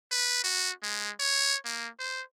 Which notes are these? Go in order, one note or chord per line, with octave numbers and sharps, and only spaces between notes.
B4
F#4
G#3
C#5
A#3
C5